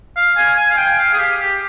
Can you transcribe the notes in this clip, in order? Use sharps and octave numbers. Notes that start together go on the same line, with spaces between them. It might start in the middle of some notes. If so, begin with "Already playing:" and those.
F5
G#5
G#5
F5
G5
F5
G#4
G4
G4